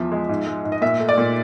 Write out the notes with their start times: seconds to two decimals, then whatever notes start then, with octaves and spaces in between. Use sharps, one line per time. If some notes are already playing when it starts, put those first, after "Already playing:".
Already playing: E2 F3 E5
0.12 G#3
0.29 G#2
0.47 G#3
0.65 G#2
0.72 D#5
0.82 A#2 E5
1.00 A3
1.09 D5
1.18 A#2